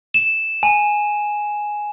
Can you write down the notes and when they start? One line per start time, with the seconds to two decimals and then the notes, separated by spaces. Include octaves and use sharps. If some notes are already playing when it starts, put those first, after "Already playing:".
0.14 E7
0.63 G#5